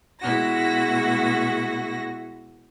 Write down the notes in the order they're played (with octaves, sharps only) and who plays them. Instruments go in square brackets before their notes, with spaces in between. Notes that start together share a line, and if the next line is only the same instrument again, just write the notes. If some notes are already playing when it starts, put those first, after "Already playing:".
[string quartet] B2 G#3 E4 F#4 A#6